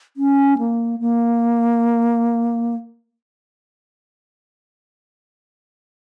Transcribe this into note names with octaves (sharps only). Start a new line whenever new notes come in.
C#4
A#3
A#3